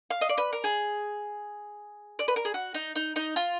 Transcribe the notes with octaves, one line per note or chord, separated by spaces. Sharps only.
F5
D#5
D5
B4
A#4
G#4
D5
B4
A#4
G#4
F#4
D#4
D#4
D#4
F4